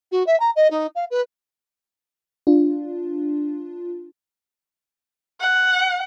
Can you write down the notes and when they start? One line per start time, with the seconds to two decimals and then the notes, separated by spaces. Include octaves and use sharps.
0.12 F#4
0.27 E5
0.40 A#5
0.56 D#5
0.70 D#4
0.95 F5
1.11 B4
2.47 D4 F4
5.41 F#5